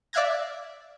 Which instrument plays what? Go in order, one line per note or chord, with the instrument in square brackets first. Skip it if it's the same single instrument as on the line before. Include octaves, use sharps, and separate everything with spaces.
[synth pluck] D5 E5 F5 F#6 G#6 A#6